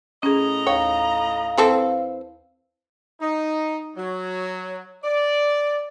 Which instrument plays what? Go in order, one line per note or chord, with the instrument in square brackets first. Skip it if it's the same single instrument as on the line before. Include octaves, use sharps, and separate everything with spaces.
[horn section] A2 D#5 A#5 [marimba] C#4 G#4
[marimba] D#2 [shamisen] C#5 [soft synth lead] F5
[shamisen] E3 C4 A4
[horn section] D#4
F#3
D5